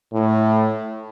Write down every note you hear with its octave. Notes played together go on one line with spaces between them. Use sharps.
A2